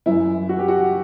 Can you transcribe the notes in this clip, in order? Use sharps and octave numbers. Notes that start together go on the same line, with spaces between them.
F#2 E3 E4
F#4
G4
F#4